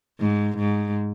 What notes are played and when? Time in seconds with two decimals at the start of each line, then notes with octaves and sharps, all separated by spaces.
0.20 G#2
0.58 G#2